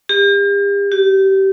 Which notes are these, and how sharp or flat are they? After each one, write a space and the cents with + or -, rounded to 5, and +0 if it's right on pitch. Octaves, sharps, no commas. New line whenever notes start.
G4 +40
G4 -25